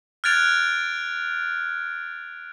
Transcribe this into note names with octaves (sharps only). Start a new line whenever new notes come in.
F6 F#6 G#6 A6 D7 F7